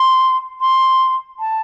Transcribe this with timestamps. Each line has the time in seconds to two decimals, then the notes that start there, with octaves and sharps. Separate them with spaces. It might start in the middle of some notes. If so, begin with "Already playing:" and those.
Already playing: C6
0.60 C6
1.39 A5